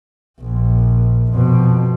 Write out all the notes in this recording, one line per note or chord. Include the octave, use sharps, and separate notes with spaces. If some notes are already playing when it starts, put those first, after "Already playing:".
A#1
F2 B2